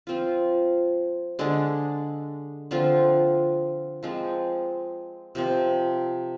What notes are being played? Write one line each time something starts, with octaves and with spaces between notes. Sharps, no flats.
F3 C4 F4
D3 G#3 D4
D3 F3 C4 F4
F3 G#3 C4
C3 F3 C4